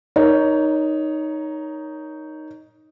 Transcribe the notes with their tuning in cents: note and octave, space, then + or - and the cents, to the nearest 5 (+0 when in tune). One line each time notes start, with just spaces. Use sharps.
D#4 +0 A#4 +20 C#5 +15